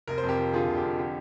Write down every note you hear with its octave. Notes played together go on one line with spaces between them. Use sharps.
F1 A#4
C5
F2
G4 A#4
F3
D3 F4 G#4
F1
G4
F2
D3 G4